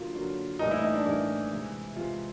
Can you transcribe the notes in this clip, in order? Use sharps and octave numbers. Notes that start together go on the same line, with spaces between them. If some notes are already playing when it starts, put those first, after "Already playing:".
Already playing: D3 F#3 A#3 F4
D3 F#3 A#3
A2 E3 G3 A#3 D#4
E4
D#4
D4
A2 E3 G3 A#3 E4
C3 E3 G#3
C3 E3 G#3 F4